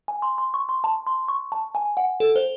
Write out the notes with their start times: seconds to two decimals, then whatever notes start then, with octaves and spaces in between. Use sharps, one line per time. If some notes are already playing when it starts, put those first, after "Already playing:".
0.08 G#5
0.22 C6
0.38 C6
0.54 C#6
0.69 C6
0.84 A5
1.07 C6
1.28 C#6
1.52 A5
1.75 G#5
1.97 F#5
2.20 A4
2.36 C5